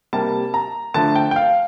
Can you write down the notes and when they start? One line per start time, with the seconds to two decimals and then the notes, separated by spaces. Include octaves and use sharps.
0.13 C3 G3 A#3 A5
0.54 A#5
0.94 D3 F3 A3 A5
1.16 G5
1.31 G5
1.36 F5